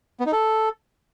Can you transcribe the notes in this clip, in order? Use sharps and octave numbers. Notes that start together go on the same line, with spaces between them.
B3
D#4
A4